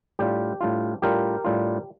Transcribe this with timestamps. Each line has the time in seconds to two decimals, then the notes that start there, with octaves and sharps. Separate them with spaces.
0.19 A2 G3 D4 F4 G4
0.61 A2 G3 D4 F4
1.02 A2 G3 D4 F4 G4 A#4
1.44 A2 G3 D4 F4